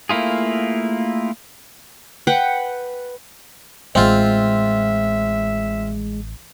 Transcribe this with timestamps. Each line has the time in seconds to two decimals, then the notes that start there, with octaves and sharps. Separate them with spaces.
0.09 A3 A#3 E4 F4 G#4
2.27 B4 F#5 G5
3.95 A1 G#3 C4 F4 E5